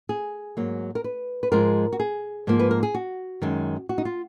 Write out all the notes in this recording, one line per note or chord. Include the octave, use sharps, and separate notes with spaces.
G#4
G#2 F#3 A#3
A#4
B4
B4
G#2 F3 G#3 A#4
F#4
G#4
G#2 F3 A#3
B4
A#4
G#4
F#4
F#2 D#3 G#3
F#4
D#4
F4